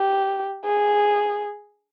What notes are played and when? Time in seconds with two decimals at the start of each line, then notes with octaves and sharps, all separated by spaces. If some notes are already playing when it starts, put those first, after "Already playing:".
Already playing: G4
0.65 G#4